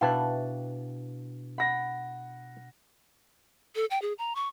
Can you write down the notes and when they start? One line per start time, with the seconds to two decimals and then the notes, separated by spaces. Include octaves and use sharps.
0.01 B2 D4 E4 B4 F5 G5 A5 F#6
1.58 F#5 B5 A#6
3.75 A4
3.91 G5
4.02 G#4
4.18 A#5
4.35 C#6